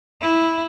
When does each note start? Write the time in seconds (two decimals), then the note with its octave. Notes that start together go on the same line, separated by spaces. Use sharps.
0.21 E4